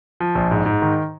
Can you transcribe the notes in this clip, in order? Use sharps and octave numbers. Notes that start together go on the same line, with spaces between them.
F3
A#1
G#2
G#2
D#3